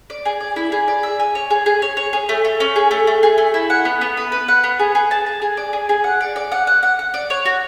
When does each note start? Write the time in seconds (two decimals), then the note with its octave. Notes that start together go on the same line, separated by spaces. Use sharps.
0.10 D5
0.25 G#4
0.41 D5
0.56 E4
0.72 G#4
0.88 D5
1.03 E5
1.20 G#5
1.35 C#5
1.50 G#4
1.66 G#4
1.82 C#5
1.97 C#5
2.13 G#4
2.29 A3
2.45 A3
2.60 C#4
2.76 G#4
2.91 A3
3.07 A3
3.23 G#4
3.38 A3
3.54 E4
3.70 F#5
3.85 B3
4.01 B3
4.17 B4
4.32 B4
4.48 F#5
4.64 B3
4.79 G#4
4.95 G#4
5.11 A5
5.26 A5
5.42 G#4
5.57 D5
5.73 G#4
5.89 G#4
6.04 F#5
6.21 D5
6.36 D5
6.52 F#5
6.67 F#5
6.83 F#5
6.99 F#5
7.14 D5
7.30 C#5
7.45 F#4